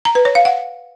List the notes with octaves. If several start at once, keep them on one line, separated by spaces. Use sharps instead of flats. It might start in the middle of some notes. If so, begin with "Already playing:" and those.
A#5
B4
C#5
F5
F#5